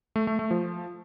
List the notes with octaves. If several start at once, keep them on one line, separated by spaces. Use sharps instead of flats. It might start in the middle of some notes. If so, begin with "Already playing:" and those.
A3
A3
A3
F3